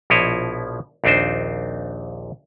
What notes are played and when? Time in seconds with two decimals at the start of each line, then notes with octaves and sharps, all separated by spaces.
0.10 A#1 B2 F3 E4 C#5 D#5
1.04 A#1 D#2 C4 D4 D#4 C5